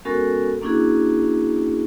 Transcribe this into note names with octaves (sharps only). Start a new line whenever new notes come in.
G#3 B3 C#4 F#4 A4 A#4
A#3 C#4 D4 E4 F#4 G#4